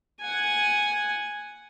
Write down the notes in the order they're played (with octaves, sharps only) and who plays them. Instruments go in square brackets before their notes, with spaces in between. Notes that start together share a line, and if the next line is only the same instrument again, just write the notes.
[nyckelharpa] F#5 G#5